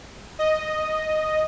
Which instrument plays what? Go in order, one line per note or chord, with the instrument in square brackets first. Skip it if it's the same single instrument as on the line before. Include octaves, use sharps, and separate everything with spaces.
[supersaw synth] D#5